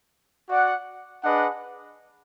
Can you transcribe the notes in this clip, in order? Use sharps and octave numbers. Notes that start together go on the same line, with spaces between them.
F#4 D5 F#5
D4 G#4 B4 D#5 F#5